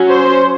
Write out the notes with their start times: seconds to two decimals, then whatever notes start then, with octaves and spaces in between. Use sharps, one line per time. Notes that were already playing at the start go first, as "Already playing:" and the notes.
Already playing: F#3 C#4
0.10 C5